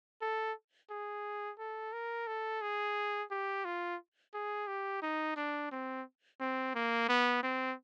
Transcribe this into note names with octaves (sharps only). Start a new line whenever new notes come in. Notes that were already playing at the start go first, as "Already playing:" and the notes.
A4
G#4
A4
A#4
A4
G#4
G4
F4
G#4
G4
D#4
D4
C4
C4
A#3
B3
C4